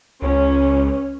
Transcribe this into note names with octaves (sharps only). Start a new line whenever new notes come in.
C#2 C#4